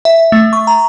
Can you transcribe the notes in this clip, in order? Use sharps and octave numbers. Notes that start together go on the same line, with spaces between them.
E5
A3
C#6
A#5